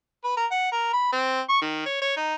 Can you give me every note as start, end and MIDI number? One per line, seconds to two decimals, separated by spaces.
0.24 0.32 71
0.37 0.46 70
0.51 0.71 78
0.72 0.91 70
0.93 1.11 83
1.12 1.41 60
1.49 1.58 85
1.62 1.83 51
1.86 2.00 73
2.02 2.17 73
2.17 2.35 63